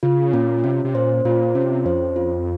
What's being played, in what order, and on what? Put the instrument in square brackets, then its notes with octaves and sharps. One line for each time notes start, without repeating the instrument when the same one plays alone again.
[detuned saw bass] C#3 [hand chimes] F4
[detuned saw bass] A#2 [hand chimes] C#4
[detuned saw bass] C3 [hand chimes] C#4
[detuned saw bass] C3
[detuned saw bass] A#2 [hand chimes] C5
[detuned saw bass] A#2 [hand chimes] F4
[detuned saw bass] C3 [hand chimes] C#4
[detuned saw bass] F2 [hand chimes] C5
[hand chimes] F4